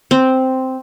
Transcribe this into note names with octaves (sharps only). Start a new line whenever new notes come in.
C4